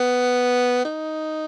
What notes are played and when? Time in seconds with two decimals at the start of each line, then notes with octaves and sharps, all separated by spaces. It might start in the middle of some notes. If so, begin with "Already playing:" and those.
Already playing: B3
0.85 D#4